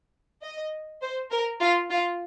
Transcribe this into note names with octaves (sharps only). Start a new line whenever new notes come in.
D#5
C5
A#4
F4
F4